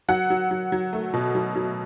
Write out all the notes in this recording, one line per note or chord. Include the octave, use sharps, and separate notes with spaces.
F#3 F#5
F#3
F#3
F#3
A3
B2
F#3
F#3